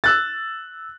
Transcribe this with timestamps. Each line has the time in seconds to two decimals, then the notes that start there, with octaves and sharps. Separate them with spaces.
0.04 E6 F#6 A6